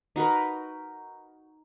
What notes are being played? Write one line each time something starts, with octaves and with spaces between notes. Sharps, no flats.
D#4 F#4 A#4 B4